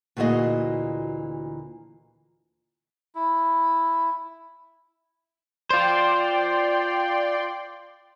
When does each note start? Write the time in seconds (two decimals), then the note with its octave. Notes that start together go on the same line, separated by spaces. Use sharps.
0.17 D2 A#2 E3 F#4 G#4 D#5
3.15 E4
5.70 F4 C5 D5 G5 C6